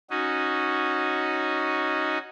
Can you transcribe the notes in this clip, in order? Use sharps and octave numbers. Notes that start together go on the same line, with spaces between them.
C#4 D#4 F#4